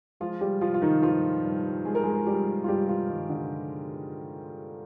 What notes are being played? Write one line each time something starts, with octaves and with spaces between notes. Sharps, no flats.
F3 G#3 F4
G3 G4
F3 F4
F4
D#3 D#4
G2 F3 F4
G2
G#3 G#4
A#4
G#3 G#4
F3 G3 G4
F4
G2 G3 G4
F3 F4
G2 D#3 D#4
D3 D4